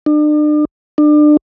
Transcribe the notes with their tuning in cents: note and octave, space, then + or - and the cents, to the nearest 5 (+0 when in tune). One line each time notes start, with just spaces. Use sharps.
D4 +40
D4 +30